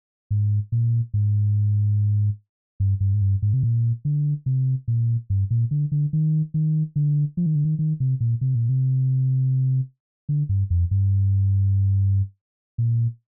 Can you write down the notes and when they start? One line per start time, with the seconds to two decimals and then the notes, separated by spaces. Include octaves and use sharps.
0.31 G#2
0.72 A#2
1.14 G#2
2.80 G2
3.00 G2
3.14 G#2
3.21 G2
3.42 G#2
3.53 C3
3.63 A#2
4.05 D3
4.46 C3
4.88 A#2
5.30 G2
5.50 A#2
5.71 D3
5.92 D3
6.13 D#3
6.54 D#3
6.96 D3
7.37 F3
7.46 D#3
7.55 D3
7.64 D#3
7.79 D#3
8.00 C3
8.20 A#2
8.41 C3
8.55 A#2
8.69 C3
10.29 D3
10.49 G2
10.70 F2
10.91 G2
12.78 A#2